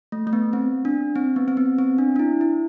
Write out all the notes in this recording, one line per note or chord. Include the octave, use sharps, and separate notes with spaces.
A3
A3
B3
C4
D4
C4
B3
C4
B3
C4
D4
D4
E4
E4